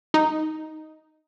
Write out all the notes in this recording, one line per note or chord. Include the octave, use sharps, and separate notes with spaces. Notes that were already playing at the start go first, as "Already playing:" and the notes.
D#4